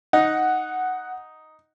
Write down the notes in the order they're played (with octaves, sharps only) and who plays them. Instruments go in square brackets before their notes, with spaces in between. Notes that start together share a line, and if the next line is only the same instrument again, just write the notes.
[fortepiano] D#4 [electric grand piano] F#5